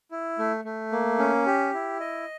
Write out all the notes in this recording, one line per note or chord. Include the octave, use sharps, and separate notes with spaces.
E4
A3
A3
A#3
C#4
G4
E4
D#5